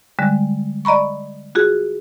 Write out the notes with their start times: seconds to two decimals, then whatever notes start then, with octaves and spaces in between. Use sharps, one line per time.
0.19 D3 G3 G#3
0.85 D5 D#5 A#5 B5 C#6
1.55 F4 F#4 G#4